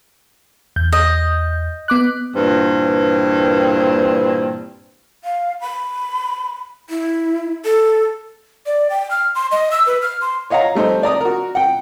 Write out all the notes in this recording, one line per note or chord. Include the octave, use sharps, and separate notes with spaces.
E2 G6
D#5
B3 D6 F#6
G2 A#2 E3 C4
F5
B5
E4
A4
D5
G5
F6
C6
D#5
E6
B4
F6
C6
C#5 D#5 F5 F#5 A#5
G3 A3 D#4 C5
D5 A#5 D#6
F#4 A#4
F#5 G5